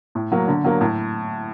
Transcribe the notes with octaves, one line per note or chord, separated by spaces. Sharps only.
A2
F#3 A#3
D3
F#3 A#3
A2